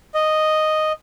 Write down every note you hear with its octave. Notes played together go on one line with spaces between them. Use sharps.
D#5